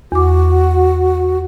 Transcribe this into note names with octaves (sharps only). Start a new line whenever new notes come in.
E2 F#4 D6